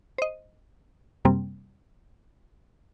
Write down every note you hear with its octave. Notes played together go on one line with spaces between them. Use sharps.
C5 D#5
F#2 C3 G3 A#3 C4